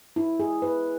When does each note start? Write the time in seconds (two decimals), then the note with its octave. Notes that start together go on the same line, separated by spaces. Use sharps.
0.16 E4
0.40 G#4
0.62 B4